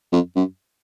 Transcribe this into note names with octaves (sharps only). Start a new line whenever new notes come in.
F2
F#2